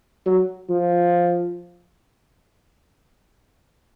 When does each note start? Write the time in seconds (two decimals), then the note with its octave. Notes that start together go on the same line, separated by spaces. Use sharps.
0.26 F#3
0.70 F3